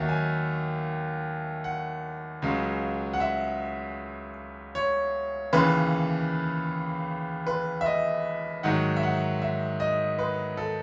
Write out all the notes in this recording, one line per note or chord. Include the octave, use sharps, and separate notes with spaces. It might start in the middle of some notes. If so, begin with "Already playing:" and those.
Already playing: D#2 D#3 F#3 E5
G#5
F#5
C#2 C#3 F#3
F#5
E5
C#5
D#2 C#3 E3 B4
B4
E5
D#5
G#2 D#3 F#3 F#5
E5
F#5
E5
D#5
B4
A4